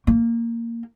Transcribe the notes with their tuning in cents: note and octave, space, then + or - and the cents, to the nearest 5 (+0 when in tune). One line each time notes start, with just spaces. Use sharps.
A#3 -10